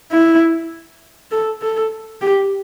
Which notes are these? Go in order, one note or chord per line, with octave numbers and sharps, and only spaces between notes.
E4
A4
A4
G4